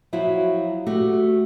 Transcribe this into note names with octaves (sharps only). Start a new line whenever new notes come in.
F3 F#3 E4 F#4
A3 F#4 G4